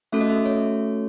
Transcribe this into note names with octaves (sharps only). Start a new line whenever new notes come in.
A3 C#4 F#4 A4 E5
D#5
E5
C#5